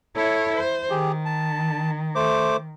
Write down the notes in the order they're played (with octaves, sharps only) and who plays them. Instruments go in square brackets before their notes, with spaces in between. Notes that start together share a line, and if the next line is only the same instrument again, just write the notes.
[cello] E4 C#5 [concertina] A4
[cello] C5
[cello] D#3 [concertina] G4 G#4
[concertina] A5
A3 C5 D6